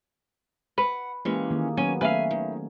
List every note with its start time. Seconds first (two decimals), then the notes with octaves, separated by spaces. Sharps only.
0.78 B4 F#5
1.25 E3 G#3 A#3 C#4 G4
1.50 D#3 A#3 G#4
1.77 F#3 B3 C#4 G#5
2.01 A3 C#4 B4 E5 F5 G#5
2.31 D#3